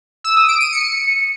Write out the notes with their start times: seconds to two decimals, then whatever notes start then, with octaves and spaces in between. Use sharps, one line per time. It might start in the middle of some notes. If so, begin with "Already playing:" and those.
0.24 E6
0.36 D#6
0.48 D7
0.60 D#7
0.72 C#7